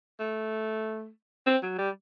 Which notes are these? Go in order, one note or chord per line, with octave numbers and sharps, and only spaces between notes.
A3
C4
F#3
G3